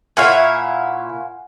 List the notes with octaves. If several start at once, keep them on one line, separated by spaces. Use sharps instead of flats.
A#2 E4 C#5 F5 F#5 G#5